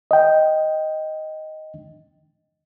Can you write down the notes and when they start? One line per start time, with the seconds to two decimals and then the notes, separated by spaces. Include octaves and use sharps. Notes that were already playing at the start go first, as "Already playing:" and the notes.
0.11 D#5 G5